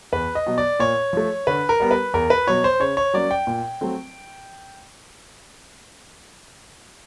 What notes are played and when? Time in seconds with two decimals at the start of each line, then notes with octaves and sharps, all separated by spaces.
0.12 E2 B4
0.35 D#5
0.47 B2 F#3
0.58 D5
0.80 A#2 C#5
1.13 F3 A3
1.47 D3 B4
1.69 A#4
1.80 G3 B3
1.91 B4
2.14 E2 A#4
2.30 B4
2.47 B2 F#3 C#5
2.64 C5
2.80 C#3 C#5
2.97 C#5
3.14 F#3 A#3 C#4 D5
3.31 G5
3.47 A#2
3.81 F#3 A3 C4